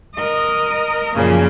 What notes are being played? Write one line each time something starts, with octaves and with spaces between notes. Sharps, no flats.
A#4 D#5
F#2 A#2 C#3 F3 A#3